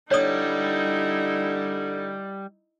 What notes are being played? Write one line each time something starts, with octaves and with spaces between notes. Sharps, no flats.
D3 G3 D#4 E4 C#5 D5 D#6